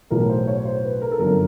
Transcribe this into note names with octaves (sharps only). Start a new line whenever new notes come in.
B1 A2 E3 A#4
C5
C#5
C5
B4
A#4
A4
G1 F#2 D3 A#4